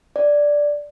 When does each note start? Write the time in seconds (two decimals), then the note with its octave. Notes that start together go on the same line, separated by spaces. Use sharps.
0.16 D5